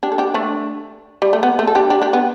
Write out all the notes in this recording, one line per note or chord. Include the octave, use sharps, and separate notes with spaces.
D4 G4
A4
D4 G4
A3 D4
G3
A3
B3
A3
A4
D4 G4
D4 G4
D4 G4
B3